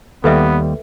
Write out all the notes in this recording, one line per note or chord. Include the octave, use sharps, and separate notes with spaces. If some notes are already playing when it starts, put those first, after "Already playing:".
D#2 G3 B3 A4 B4 E5